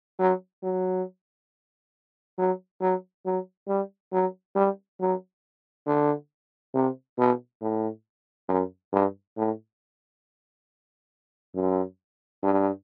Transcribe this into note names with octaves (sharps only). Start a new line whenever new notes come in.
F#3
F#3
F#3
F#3
F#3
G3
F#3
G3
F#3
D3
C3
B2
A2
F#2
G2
A2
F#2
G2